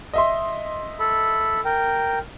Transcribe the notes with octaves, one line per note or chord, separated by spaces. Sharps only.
D#5 E5 C6
A4 B5
A#4 G5